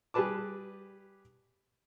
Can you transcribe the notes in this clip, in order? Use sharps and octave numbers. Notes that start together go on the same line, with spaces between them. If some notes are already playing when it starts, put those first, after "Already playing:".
G3 G4 G#4 B4 A5 D6